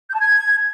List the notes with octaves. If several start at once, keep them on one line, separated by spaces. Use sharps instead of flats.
G6
A5
G#6